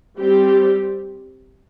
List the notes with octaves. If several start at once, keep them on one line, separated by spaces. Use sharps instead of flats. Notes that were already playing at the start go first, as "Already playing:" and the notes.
G3 C4 G4